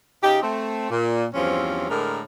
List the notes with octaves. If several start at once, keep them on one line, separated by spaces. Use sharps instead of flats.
C#3 D#4 G4
A3 C4
A#2
E2 G2 F3 C4 C#4
A2 D3 G#3 A#4